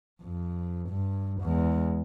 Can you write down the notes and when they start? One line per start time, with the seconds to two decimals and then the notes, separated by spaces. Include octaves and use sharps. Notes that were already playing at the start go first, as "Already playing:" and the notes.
0.22 F2
0.89 G2
1.42 E2 G#3